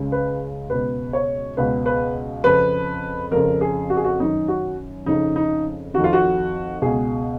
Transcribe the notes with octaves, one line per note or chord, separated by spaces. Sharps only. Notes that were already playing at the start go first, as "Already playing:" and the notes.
Already playing: C#2 C#3
B4
C#2 B2 B4
C#5
C#2 B2 B4
B4
F2 C#3 B4
F2 C#3 A#4
G#4
F#4
G#4
F#4
F#2 D#3 D#4
F#4
F2 C#3 D#4
D#4
F2 D#3 F#4
F4
F#4
C#2 B2 G#4